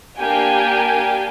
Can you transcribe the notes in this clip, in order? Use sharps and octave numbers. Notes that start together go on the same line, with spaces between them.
A#3 D4 G4 G5 G#5